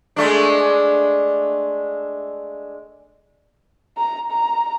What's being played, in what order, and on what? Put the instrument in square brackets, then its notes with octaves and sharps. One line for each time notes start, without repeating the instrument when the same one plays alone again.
[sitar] G#3 A3 D4
[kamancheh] A#5
A#5